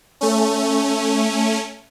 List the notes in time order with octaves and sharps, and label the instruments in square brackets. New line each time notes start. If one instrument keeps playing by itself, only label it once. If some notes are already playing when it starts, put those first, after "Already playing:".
[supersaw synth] A3 C#4